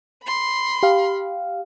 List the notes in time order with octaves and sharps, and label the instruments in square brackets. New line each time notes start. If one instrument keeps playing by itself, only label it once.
[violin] B5 C6
[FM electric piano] G4 F5